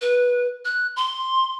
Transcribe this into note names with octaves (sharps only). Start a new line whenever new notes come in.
B4
F#6
C6